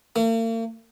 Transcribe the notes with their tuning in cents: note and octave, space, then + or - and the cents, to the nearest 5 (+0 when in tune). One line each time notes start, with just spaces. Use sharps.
A#3 -45